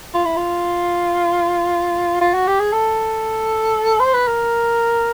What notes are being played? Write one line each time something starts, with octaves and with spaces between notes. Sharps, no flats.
F4
E4
F4
F4
F#4
G4
G#4
A4
C5
B4
A#4